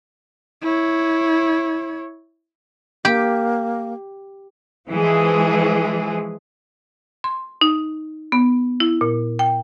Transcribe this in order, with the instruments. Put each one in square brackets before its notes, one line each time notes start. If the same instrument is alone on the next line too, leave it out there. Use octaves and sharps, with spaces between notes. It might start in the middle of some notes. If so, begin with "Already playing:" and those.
[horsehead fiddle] E4 C#5
[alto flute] A#3 [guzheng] G4
[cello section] E3 F3 G#3 G#4
[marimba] C6
D#4
B3
E4
A#2
G5